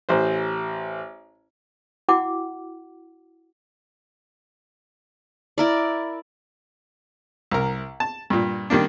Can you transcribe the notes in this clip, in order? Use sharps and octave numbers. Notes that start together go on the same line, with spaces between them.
A1 C5
E4 F#4 F#5 G5 D6
E4 A#4 D5
C2 A#4
A5
G2 A#2
D#3 G3 A#3 D4